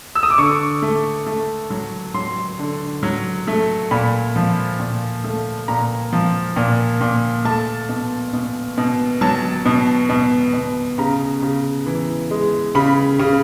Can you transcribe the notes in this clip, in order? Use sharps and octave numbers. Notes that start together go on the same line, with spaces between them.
E6
D#6
D6
D3 C#6
A3
A3
F#3
F#3 C6
D3
F#3
A3
A#2 B5
F3
A#2
A3
A#2 A#5
F3
A#2
A#2
A3 A5
B2
B2
B2
F#3 A5
B2
B2
B2
C#3 A#5
C#3
E3
G#3
C#3 B5
C#3